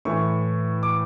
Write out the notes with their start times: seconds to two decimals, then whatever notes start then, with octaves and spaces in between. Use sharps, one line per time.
0.05 A2 E3 C#6
0.83 D6